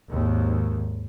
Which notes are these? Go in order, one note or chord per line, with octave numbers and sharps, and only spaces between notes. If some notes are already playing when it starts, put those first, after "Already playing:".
G#1 D#2